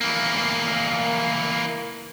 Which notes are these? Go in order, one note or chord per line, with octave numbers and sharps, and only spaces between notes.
E3 A#3